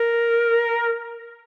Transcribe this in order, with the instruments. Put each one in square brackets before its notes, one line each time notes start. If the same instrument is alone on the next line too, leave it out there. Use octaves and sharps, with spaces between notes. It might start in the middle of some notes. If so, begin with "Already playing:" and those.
Already playing: [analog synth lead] A#4